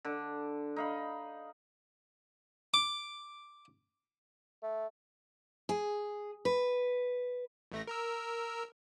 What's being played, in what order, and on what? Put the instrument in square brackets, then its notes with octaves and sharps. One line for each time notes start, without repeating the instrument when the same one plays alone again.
[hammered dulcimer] D3
D#4 F5 B5
[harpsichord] D6
[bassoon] A3
[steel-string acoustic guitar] G#4
B4
[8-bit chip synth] A1 A3 A#6
A#4 A#5 E6